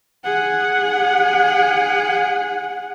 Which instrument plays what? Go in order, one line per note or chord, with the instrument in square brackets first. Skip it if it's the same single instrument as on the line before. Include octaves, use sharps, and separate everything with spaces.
[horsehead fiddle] G#4 F#5